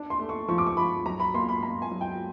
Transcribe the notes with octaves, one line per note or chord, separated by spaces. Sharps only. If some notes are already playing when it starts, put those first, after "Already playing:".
Already playing: D4
C6
A3
C#6
F3 C#6
D6
C#6
F3 B5
F#3 A#5
B5
A#3 C6
B5
A#3 A#5
G#5
F#3
G5